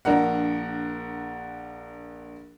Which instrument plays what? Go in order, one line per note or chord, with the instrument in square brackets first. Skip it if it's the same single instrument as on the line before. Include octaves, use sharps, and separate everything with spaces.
[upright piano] A#1 D4 A#4 F#5